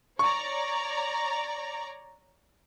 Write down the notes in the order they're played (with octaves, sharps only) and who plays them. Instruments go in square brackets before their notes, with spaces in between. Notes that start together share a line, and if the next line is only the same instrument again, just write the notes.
[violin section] C#5 D5 A#5 [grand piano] C#6